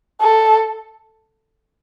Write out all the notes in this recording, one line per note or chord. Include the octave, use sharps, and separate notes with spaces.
A4